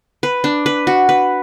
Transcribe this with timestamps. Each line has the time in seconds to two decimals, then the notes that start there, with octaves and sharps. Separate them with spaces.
0.23 B4
0.44 D4
0.66 B4
0.87 F#4
1.09 B4